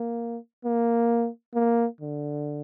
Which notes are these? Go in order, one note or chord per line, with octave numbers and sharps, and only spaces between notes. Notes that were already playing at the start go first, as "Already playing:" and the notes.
Already playing: A#3
A#3
A#3
D3